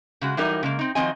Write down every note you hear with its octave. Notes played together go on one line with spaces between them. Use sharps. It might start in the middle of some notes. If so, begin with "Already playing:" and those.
C#3 G#3 F#4
E3 F#3 G3 D#4 A#4
C#3 G#3 A#3
C4 D#4
D#3 F3 F#3 C4 D#5 G#5